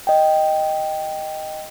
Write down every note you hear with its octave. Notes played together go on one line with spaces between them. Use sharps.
D#5 G5